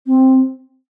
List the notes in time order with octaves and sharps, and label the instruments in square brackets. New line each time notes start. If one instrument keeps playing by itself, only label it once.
[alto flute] C4